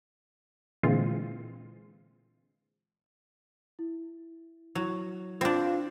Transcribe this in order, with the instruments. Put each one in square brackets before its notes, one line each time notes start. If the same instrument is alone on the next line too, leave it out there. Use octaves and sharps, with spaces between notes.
[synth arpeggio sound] A#2 D3 E3 G#3 C4 F4
[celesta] E4
[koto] F#3 [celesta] E4
[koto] C4 D4 [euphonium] F4